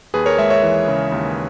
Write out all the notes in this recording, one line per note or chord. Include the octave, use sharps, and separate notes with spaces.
D#2 G#4 B4
A#4 C#5
G#3 C#5 E5
C#5 E5
E3
C#3
D#2